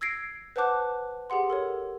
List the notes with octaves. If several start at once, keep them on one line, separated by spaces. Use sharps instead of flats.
E6 G#6 A#6 C7 D7
B4 C5 F#5 A5 D6 F#6
G4 G#4 F#5 C6
A4 A#4 C#5